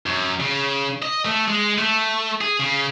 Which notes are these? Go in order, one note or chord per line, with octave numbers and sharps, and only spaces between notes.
F#2
C#3
D#5
A3
G#3
A3
G#4
C#3